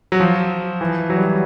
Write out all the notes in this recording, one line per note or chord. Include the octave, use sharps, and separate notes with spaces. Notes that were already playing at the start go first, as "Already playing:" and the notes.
F#3
F3
E3
F#3
G3
F#3